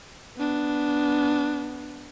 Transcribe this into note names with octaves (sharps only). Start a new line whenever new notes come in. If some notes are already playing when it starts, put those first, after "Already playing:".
B3 D4